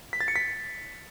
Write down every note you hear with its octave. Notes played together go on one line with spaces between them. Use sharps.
B6
A6
C#7
B6